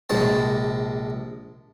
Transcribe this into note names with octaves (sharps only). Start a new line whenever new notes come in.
A#1 C3 G#3 A5